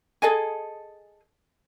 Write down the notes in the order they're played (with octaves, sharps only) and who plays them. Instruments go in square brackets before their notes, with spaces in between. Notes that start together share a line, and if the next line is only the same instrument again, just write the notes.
[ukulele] G#4 A4 D#5 G#5